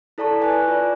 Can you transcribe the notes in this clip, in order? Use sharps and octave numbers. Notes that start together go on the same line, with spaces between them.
E4 A4 D5 A5 A#5 C#6
B4 G#5 F#6
F4 D5